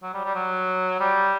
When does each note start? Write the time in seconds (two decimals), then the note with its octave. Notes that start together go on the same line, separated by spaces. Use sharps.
0.03 F#3
0.14 G3
0.25 G3
0.35 F#3
1.00 G3